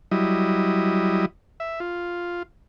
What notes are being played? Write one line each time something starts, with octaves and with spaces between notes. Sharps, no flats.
F#3 G3 E4 D#5
E5
F4